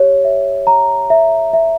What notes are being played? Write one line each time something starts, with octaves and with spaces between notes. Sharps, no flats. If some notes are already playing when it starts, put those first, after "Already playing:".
Already playing: G4 C#5
E5
A#5
E5
E5